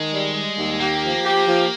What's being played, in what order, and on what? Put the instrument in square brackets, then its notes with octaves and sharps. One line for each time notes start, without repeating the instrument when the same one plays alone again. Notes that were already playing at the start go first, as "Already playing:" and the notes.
Already playing: [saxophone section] D#3 [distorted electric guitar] G#3
[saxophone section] G3
G3
D#2
[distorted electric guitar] A#3 [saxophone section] G4
[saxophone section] F3
G4
F3